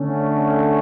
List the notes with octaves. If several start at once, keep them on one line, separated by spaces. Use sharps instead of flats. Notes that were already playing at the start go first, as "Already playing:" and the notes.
Already playing: D3 A3 C#4